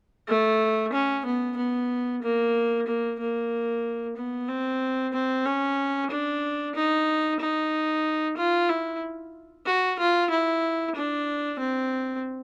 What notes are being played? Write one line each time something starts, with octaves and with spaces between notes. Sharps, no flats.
A3
C#4
B3
B3
A#3
A#3
A#3
B3
C4
C4
C#4
D4
D#4
D#4
F4
E4
F#4
F4
E4
D4
C4